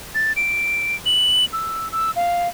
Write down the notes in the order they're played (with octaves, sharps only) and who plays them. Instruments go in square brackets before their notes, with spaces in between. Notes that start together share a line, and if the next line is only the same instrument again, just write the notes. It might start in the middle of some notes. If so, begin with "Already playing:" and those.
[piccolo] A6
D7
F#7
E6
E6
F5